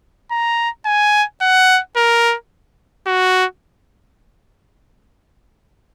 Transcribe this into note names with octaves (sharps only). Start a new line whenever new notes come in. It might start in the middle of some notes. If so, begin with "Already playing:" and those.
A#5
G#5
F#5
A#4
F#4